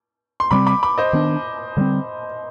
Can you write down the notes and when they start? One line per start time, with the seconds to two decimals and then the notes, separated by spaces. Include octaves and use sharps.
0.40 C6
0.51 C3 G3 C4 B5 D6
0.67 B5 D6
0.83 B5 D6
0.98 C5 D#5
1.13 D#3 B3 D4
1.77 D3 G3 C4